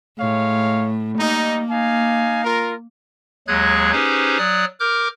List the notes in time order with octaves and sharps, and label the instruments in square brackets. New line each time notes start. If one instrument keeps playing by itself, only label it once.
[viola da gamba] A2 [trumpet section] G#3 C#5 F5
[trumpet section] G3 D#4 [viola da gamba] A#3
[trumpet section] D#4 F5 G#5
F4 A#4
[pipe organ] D#2 F#3 G#3 G#4 F#6 G#6
C#4 D#4 G4 G#4 B4 C5
F#3 D5 D#6 F6 F#6
A#4 D6 F6 G6